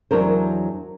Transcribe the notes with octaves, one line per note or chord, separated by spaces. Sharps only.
E2 F#3 D4 A#4 C5